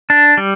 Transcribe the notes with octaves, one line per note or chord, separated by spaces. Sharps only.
D4
G3